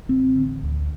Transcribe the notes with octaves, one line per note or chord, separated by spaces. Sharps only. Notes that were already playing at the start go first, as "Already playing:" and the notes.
A1 C4
D3
D2